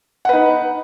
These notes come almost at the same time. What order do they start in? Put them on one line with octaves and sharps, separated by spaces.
F#5 B4 D#4